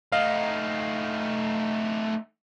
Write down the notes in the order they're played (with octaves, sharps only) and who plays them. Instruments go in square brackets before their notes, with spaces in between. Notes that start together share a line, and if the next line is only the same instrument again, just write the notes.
[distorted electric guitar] A3 D#4 [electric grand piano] D#5 F5